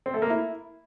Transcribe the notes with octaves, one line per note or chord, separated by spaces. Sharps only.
C4
A3
A#3
E4